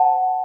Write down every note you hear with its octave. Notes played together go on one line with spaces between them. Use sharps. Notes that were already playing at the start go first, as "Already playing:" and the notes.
Already playing: C5 F#5 A5